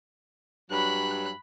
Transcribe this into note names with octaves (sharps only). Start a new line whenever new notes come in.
G2 F#3 B5 F#6